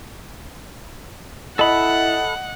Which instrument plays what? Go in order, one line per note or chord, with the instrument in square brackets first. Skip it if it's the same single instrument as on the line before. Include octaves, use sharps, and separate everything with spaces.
[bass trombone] E4 [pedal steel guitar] A4 B5 [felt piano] D#5 [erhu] F#5